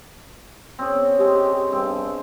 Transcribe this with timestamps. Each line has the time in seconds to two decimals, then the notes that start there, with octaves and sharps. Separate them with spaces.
0.79 C4 C#4 G#4
1.20 G#3 G4
1.72 G2 C4